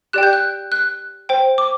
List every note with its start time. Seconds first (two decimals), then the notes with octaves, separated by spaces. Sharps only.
0.13 G4 D5 G5 F#6
0.23 G6
0.33 F#6
0.72 F#6
1.29 C5 G5
1.58 D6